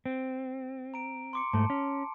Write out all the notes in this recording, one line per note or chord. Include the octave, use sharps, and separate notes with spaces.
C4
A#5 D7
C6 D6 C#7
G#2 A3 A5
C#4